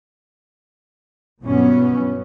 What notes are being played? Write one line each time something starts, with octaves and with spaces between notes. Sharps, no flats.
G2 B2 E3 F#3 B3 C#4